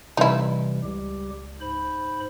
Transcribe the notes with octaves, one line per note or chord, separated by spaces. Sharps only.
C3 E3 G3 D#4 E4
C#2 G3 G4
G#2 C5 B5